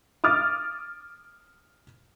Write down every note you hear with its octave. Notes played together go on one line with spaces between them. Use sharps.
D6 D#6 F6 A6